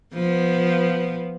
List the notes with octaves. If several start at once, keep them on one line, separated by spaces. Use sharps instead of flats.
F3 B3